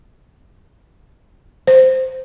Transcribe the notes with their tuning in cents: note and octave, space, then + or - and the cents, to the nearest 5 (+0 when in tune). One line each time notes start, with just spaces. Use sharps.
C5 -5